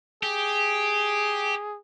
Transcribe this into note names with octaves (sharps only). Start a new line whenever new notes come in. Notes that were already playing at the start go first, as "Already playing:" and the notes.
G4 G#4